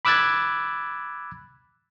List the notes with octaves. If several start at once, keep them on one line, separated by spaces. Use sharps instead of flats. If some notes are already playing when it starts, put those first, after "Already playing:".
B5 D6 E6 F#6 G#6 A6